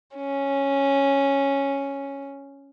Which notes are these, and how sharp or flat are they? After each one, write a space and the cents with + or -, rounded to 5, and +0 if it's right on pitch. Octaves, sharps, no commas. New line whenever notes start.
C#4 -5